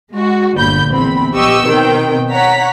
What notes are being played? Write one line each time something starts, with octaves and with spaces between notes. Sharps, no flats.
G#3 F#4
G1 A#2 D3 B5 G6
A#1 E2 C4 B5
A#1 B3 G4 D#5 C#6 E6
B2 D#3 B3 C4 G5
C#5 F#5 A#5 B6